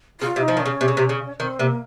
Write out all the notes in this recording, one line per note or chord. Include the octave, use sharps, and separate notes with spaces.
C#3 F4
C3
D#4
F3
D#3
C#4
C#3
C3
C#3
C3
C#3
D#3 C4
C3 A#3